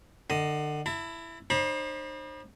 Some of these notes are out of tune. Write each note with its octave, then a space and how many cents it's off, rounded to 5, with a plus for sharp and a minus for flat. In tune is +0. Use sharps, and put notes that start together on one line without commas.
D3 +30 D#5 +10
E4 +10 A5 +45
D#4 -45 C5 +35 B5 -35